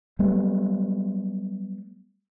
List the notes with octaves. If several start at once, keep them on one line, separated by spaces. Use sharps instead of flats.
F#3 G3 A3 B3